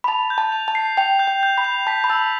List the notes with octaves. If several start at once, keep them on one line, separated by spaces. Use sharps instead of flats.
B5
A5 F7
G6
A5
F7
A5
C7
G5 F7
G6
G5
G6
B5
F7
A5 B6
B5
A5 E6